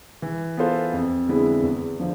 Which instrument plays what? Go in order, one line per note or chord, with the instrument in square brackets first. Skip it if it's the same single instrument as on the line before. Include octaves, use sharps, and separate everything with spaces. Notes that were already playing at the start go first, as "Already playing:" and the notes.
[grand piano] E3
B3 F4 A4 C5
F2
D3 G#3 B3 E4
E2
D3 F3